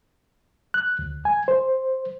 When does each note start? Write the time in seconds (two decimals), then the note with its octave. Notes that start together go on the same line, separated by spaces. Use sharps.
0.74 F#6
0.99 D2
1.25 G#5
1.48 C5